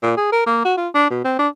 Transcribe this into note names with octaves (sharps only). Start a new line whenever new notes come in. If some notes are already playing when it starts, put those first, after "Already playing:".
A#2
G#4
A#4
A#3
F#4
F4
D4
B2
C4
D4